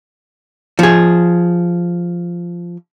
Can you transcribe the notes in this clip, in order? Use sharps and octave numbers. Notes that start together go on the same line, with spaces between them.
F3 G#4